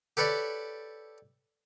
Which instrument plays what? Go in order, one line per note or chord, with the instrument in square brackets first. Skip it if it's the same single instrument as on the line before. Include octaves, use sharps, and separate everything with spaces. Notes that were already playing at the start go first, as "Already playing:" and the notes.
[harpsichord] G4 A4 B4 C#5 D5